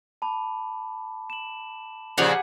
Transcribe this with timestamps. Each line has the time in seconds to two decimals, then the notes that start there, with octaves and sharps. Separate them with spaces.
0.22 A5 B5 D6
1.30 E7 F#7
2.18 A#2 C#3 F3 G4 G#4 F#5